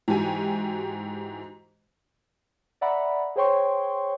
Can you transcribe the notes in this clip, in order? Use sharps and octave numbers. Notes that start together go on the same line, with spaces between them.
G#2 E3 F#4 G4 G#5
D5 E5 F#5 A#5 B5
G#4 C5 C#5 G5 C6 C#6